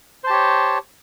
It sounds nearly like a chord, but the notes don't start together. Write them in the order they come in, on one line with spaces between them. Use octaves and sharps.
C5 A5 G4 C#5